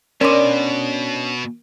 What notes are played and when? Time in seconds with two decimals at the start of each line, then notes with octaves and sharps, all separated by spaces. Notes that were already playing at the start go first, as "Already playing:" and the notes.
0.21 B2 C#4 D4 A#4 D5 C6 D6